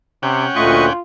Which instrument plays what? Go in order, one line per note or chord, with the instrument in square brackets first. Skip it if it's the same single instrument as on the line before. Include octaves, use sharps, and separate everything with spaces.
[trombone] C3 [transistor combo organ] C#4 F#5 G5
[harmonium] D2 A#2 A3 [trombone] F4 [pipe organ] B4 D#5 C#6